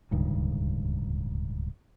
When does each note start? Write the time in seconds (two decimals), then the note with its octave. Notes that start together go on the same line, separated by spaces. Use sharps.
0.11 D1 C#2 G2 D#3